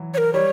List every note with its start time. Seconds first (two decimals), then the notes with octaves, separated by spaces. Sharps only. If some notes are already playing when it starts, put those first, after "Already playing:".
Already playing: E3 F#3
0.14 C#5
0.18 A#4
0.33 G3 C#5